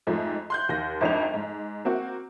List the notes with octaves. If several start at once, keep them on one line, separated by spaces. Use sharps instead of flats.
F2 G#2 F3 A3
C6 F#6 G6
D#2 A#6
G#1 F2 G#2 D4 F7
G#2
A#3 C4 F#4